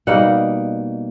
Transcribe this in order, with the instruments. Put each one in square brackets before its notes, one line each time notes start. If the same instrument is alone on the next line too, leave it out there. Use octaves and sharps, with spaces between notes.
[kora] B2 G3 A#3 D#4 F#5